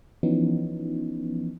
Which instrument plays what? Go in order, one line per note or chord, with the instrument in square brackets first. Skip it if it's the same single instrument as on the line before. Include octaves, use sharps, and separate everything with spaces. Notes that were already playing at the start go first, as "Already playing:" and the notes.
[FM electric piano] E3 F3 B3 C#4 D#4